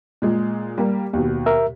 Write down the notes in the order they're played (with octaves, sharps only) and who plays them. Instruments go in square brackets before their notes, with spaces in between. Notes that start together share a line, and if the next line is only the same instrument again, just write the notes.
[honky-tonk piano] A#2 G#3
G3 A#3 G4
D#2 B2
[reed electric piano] A#4 E5